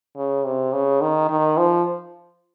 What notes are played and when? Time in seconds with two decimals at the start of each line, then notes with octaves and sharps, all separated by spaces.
0.17 C#3
0.45 C3
0.73 C#3
1.01 D#3
1.29 D#3
1.57 F3